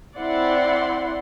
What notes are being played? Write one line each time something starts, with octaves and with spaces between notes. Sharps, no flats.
C4 E4 D5 F#5 C6